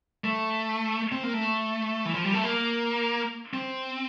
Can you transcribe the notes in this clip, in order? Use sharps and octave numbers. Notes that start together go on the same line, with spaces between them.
A3
C4
A#3
A3
E3
F3
G3
A3
A#3
C4